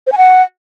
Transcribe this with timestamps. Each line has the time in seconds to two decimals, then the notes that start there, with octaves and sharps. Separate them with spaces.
0.07 C5
0.12 G#5
0.18 F#5